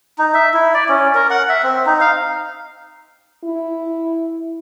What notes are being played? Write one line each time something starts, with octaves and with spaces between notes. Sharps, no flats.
D#4
E5
E4
D5
C#4
A#4
F#5
E5
C4
D#4
F5
E4